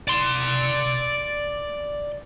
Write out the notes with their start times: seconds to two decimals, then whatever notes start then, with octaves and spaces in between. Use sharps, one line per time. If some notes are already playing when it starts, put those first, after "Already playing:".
0.08 D5 C6